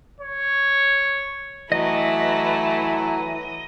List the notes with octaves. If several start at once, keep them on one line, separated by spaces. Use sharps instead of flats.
C#5
E3 F#3 A3 E4 D#5